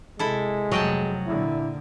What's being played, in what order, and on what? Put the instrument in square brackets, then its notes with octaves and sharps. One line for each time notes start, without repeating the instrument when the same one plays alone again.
[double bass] C3 [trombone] G#3 [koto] E4 A4
[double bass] F1 F3 [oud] F#3 [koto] D#5 G5 A5
[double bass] A#2 D3 [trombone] E4